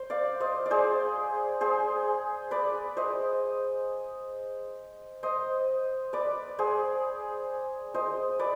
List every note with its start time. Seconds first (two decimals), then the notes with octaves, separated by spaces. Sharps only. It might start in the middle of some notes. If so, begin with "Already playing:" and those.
Already playing: C5
0.10 D5 F5
0.40 C5 D#5
0.66 D5
0.71 G#4 C5
1.61 G#4 C5
2.51 B4 D5
2.97 C5 D#5
5.23 C5 D#5
6.13 B4 D5
6.59 G#4 C5
7.94 C5 D#5
8.39 B4 D5